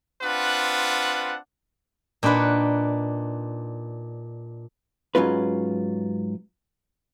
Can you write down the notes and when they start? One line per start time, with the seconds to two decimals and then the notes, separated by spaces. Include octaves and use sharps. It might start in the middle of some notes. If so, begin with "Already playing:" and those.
0.23 C4 D4 F4 B4 F#5
2.23 A#2 D4 D#4 B4 F#5
5.15 G#2 F#3 C#4 F4 B4